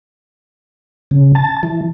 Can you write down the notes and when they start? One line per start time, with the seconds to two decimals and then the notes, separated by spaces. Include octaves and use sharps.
1.11 C#3
1.35 A5
1.63 E3